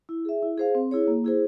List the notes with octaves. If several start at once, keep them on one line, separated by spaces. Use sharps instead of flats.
E4
G#4 E5
E4
G#4 C5 F5
C4
E4 G#4 C#5
A#3
E4 G#4 C5